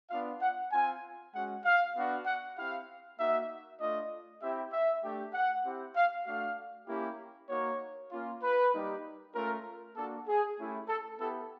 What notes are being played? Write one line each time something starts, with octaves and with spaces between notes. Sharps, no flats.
B3 D4 F4 F5
F#5
C4 F4 G#5
G#3 C#4 F#4 F#5
F5
B3 D4 F#4
F#5
C4 E4 G4 F5
A#3 D#4 F#4 E5
A3 D4 F4 D#5
C4 E4 G4 E5
E5
A3 D4 G4
F#5
C4 E4 G4
F5
A3 D4 F#4 F5
A#3 C#4 E4 G4
A#3 D#4 F#4 C#5
A#3 C#4 F4
B4
G3 A#3 D#4 G4
A3 C#4 F4 A#4
A#3 D4 F#4 A4
G#4
A3 C#4 E4 G4
A4
B3 E4 G4 A4